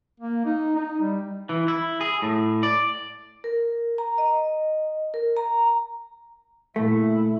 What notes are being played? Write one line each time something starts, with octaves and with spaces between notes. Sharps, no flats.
A#3
D#4
D#4
G3
E3
E4
G#4
A2
D5
A#4
A#5
D#5
A#4
A#5
A#2 A3 E4